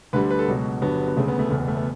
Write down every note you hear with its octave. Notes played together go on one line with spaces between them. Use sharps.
D2 D3 G3 B4
B4
A4
C#2 B2 F#3
G1 G2 F#3 B3
B3
E1 D2 C#3 A3
B3
A3
F#1 E2 B2 A3
B3
A3
B3